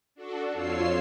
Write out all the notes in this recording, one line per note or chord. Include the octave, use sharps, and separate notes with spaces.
D4 F#4 A4
F2 F4 C#5 E6 C7